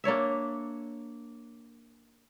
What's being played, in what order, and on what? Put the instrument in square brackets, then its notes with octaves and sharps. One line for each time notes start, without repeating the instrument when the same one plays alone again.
[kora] A#3 D4 C#5 E5